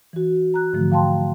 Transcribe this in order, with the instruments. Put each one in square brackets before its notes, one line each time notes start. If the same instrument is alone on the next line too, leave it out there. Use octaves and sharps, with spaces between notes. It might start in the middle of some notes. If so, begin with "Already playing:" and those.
[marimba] E3 F#4
A#5 F#6
G#2 D3 E3 F3 A3
F5 G5 A5 C6